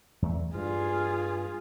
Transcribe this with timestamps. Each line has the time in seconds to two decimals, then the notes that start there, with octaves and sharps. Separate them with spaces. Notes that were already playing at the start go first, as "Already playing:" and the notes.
0.22 E2 A3
0.55 G2 F4 G#4